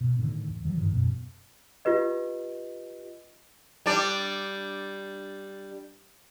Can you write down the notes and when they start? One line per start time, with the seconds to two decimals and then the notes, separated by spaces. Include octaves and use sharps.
0.01 B2
0.19 A2 D3 D#3
0.49 E2
0.65 D#3 E3 F#3 G3
0.77 G2 D3 D#3
0.92 E1 F#2 B2
1.85 F4 G4 B4 D#5
3.86 G3 D4 D5